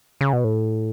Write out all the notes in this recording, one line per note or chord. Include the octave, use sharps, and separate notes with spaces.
C#3
B2
A2